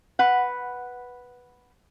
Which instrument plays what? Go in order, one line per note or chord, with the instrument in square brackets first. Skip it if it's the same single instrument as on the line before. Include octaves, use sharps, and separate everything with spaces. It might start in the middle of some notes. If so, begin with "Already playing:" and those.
[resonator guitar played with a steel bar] B4 F#5